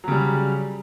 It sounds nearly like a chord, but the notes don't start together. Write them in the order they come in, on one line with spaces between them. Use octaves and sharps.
F#3 C#3 G3